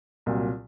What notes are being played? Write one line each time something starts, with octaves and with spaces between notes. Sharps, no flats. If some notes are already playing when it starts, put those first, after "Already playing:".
C2 A#2 F#3